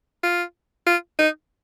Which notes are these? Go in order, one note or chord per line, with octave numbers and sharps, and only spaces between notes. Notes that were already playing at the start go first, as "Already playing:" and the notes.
F4
F4
D#4